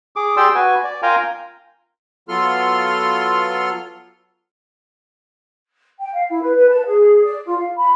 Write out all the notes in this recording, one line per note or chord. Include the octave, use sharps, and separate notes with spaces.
G#4 D6
G4 G#4 D5 G5 C6 E6
F#4 B4 G#5
D5
F4 A#4 F5 G5 G#5 A#5
F#3 B3 F4 A4 C6 F6
G5
F5
E4
B4
B4
A5
G#4
D5
F4
F5
B5